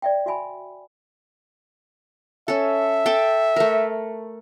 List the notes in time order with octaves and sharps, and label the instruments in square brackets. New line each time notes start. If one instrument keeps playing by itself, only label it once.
[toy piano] D5 E5 G5
F#4 E5 G#5 B5
[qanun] C#4 A4 [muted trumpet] E5
[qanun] A4 G5 D6
A3 A#4